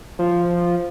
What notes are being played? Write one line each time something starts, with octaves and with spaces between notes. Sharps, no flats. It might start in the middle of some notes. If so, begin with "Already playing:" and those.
F3